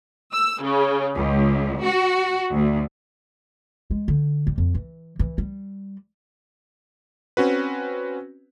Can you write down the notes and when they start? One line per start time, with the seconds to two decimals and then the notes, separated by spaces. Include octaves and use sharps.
0.32 E6
0.61 C#3
1.15 C#2
1.83 F#4
2.51 D2
3.91 G#3
4.08 D3
4.47 G3
4.58 F2
4.75 E3
5.19 E3
5.38 G3
7.37 C4 C#4 F#4 B4